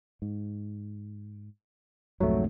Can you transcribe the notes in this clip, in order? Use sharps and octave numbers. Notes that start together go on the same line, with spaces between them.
G#2
B1 F2 G#2 F#3 A3